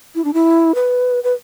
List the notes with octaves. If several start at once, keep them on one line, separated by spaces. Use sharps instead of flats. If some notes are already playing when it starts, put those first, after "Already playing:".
E4
D4
E4
B4
B4